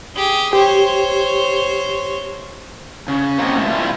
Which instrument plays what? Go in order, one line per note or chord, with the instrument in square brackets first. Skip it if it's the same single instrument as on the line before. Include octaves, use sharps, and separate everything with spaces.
[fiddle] G4 G#4
[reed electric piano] G4 [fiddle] C5 C#5
[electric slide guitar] C#3
A#3 C4 G4 C#5 D#5 F#5
G#2 B2 A3
B2 D#3 G3 E4 F4